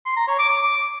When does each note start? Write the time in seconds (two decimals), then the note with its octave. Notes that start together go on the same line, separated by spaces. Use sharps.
0.06 C6
0.17 A#5
0.28 C#5
0.38 D6
0.49 D6